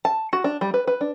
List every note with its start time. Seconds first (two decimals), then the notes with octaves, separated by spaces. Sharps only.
0.05 A5
0.33 F#4
0.44 D4
0.61 G3
0.74 B4
0.87 B4
1.01 D4